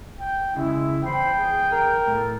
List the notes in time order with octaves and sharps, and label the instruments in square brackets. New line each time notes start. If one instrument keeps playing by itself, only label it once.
[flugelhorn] G5
[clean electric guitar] C#3 [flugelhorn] G#3 [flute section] E4
[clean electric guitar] E2 [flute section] C5 B5 [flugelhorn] G5
[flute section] G#4
[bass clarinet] A#4
[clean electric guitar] A2 [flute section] A4